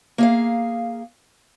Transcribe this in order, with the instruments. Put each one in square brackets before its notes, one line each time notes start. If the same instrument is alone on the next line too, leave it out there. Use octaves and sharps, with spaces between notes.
[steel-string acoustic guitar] A#3 G#4 F5